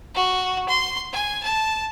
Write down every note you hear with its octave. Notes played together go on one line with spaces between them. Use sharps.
F#4
C6
G#5
A5